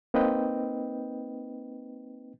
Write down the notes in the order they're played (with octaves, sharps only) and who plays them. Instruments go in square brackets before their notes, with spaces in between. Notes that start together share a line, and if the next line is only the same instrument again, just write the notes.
[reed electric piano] A#3 C4 D#4 B4 D#5 G5